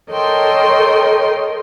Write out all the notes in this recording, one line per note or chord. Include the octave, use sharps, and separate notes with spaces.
A4 A#4 C#5 D#5 G5 C6